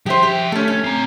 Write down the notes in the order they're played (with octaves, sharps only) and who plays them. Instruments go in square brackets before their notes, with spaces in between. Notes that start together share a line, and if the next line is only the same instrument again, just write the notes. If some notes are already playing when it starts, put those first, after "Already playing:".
[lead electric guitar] F3 E5 [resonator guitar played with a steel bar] G4 C5
[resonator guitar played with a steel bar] G4
[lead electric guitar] A3 [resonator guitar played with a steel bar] C#4 A4
[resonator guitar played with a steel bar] C#4
[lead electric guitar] C4 A#5